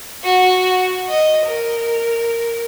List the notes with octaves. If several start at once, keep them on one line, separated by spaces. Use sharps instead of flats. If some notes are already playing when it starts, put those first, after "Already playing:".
F#4
D#5
A#4